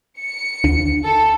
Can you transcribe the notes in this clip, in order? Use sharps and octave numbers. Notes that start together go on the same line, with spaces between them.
C#7
D2
A4